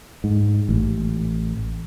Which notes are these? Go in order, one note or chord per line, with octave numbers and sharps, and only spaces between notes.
G#2
A1